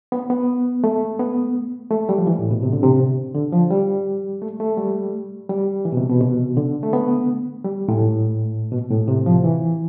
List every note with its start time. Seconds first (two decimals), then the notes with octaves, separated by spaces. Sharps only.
0.12 B3
0.30 B3
0.84 A3
1.19 B3
1.91 A3
2.09 G3
2.18 F3
2.27 E3
2.39 A2
2.51 B2
2.62 C3
2.72 D3
2.83 C3
3.34 D3
3.52 F3
3.71 G3
4.42 A3
4.60 A3
4.78 G3
5.49 G3
5.85 E3
5.92 B2
5.97 C3
6.10 B2
6.21 B2
6.57 D3
6.83 A3
6.93 B3
7.64 G3
7.88 A2
8.72 B2
8.90 A2
9.08 C3
9.26 F3
9.44 E3